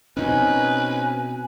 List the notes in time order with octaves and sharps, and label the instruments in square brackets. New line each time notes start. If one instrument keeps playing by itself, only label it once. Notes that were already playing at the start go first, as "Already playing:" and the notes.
[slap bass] B2 C4 [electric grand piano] C#4 D#4 C5 [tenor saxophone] B4 [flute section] G#5